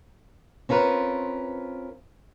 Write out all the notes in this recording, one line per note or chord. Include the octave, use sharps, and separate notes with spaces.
C4 C#4 F4 A#4 B4